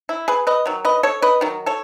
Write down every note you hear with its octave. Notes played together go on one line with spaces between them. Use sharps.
E4
G#4 B4
B4 D#5
D#3 F#3
B4 D#5
A4 C#5
B4 D#5
D#3 F#3
A4 C#5